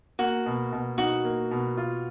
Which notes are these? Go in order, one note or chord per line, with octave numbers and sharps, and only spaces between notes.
A#3 F#4
B2
B2
D#4 F#4
A#3
B2
F4